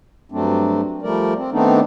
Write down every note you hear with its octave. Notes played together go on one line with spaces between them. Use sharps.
G2 F#3 A3 C4 D4
F3 G3 A3 A#4 D5
C4
D#3 A3 B3 C4 D4 D#4